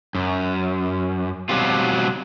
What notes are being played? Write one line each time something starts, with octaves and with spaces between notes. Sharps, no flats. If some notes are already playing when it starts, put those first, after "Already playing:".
F#2
B2 F#3 G3 C4 F4